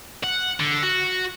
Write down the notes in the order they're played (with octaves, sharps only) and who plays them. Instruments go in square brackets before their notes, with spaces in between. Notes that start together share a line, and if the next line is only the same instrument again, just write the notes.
[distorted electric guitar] F#5
D3
F#4